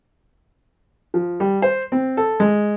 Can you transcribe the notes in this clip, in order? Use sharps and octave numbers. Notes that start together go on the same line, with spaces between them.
F3
G3
C5
C4
A4
G#3